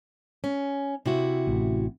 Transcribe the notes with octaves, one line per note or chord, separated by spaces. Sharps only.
C#4
C3 E4 F#4
A1